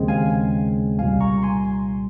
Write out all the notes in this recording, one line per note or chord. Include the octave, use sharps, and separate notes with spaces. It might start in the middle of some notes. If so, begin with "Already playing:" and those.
Already playing: D#2 C#3 G#3 C4
F5 G#5
C2 A#2 G3 F5 G#5
A#5 C#6
G#5 C6